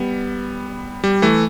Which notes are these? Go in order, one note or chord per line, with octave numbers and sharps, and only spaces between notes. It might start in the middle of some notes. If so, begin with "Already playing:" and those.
Already playing: G3 B3
G3
E3 A3